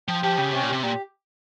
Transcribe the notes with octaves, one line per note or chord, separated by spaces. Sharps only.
F3 G5
F3 G4
C#3 G5
C3 C#4
A#2
C3 G4
A#2 G4